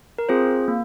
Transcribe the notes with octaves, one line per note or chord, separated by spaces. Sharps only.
A#4
C4 F4 G#4 C5
A#3